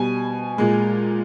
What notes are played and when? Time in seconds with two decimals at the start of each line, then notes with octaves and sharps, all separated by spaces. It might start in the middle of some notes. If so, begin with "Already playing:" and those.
Already playing: B2 G3 G#5
0.58 A#2 G#3